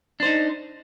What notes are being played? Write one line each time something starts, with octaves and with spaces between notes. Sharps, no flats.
D4 D#4 C5